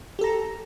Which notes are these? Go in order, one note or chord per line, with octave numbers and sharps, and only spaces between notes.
G4 A4 A#5